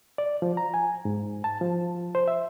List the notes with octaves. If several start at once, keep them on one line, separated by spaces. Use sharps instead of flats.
D5
F3
A#5
G#5
G#2
A5
F3
C5
E5